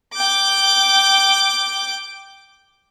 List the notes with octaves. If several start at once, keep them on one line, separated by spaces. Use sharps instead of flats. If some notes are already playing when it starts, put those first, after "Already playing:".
G5 D6